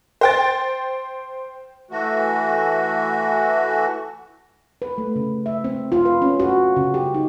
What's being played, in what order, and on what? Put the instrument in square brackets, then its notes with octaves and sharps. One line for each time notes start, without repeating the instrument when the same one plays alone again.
[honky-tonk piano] C5 G5 A6
[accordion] E3 A3 F#4
[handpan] B4
A3
C#3
E5
C4
F4
B4
C#4
F#4
C#3
G4
D#4